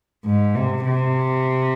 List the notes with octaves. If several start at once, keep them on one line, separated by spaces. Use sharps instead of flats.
G#2
C3
C3